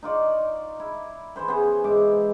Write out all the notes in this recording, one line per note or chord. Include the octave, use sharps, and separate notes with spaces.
D#4 F4 D5 C#6
E4
E3 E4 C5 B5
B3 C#4 G#4 C5
G#2 E5 D6